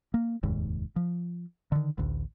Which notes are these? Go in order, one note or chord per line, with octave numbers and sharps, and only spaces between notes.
A#3
F1 D#2 G#2
F3
D3 D#3
A1 D2